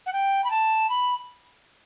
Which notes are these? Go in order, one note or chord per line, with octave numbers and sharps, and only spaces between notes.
F#5
G5
B5
A5
B5